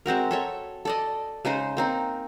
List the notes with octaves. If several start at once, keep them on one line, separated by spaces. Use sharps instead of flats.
G#3 C4 F#4 A#4
A4 C#5 E5
A4 D5 D#5
C#3 G#3 D#4 C5
A#3 C4 D#4